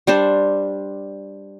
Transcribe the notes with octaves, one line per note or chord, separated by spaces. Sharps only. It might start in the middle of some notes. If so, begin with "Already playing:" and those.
G3 D4 C5